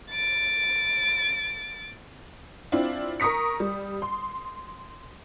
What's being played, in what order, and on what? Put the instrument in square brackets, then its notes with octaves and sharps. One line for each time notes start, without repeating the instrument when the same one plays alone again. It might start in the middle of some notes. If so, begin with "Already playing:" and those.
[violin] A6 D7
[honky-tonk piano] C4 D4 E4 F4
A#4 C#6 D#6 B6 C#7
G3
C6